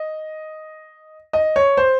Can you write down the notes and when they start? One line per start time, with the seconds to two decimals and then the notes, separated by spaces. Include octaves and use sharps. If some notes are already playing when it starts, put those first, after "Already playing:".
Already playing: D#5
1.33 D#5
1.56 C#5
1.77 C5